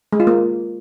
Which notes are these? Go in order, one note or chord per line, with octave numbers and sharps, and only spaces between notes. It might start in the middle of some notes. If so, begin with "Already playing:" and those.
G#3
F4
A#3